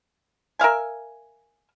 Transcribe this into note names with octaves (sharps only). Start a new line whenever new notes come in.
A#4 E5 F5 G#5